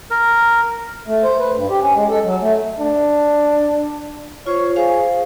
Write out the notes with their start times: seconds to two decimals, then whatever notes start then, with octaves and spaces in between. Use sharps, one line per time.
0.10 A#4
1.07 A3
1.24 C5
1.39 B4
1.54 G2
1.69 G4
1.81 C#4
1.94 G#3
2.10 A4
2.24 F#3
2.42 A3
2.80 D4
4.46 F4 C5 C#5
4.76 G#4 C5 F5